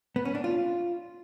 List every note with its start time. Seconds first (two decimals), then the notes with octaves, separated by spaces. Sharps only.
0.16 B3
0.25 C#4
0.35 D4
0.44 F4